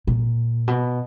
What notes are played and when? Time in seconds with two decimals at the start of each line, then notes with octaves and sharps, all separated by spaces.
0.07 A#2
0.68 B2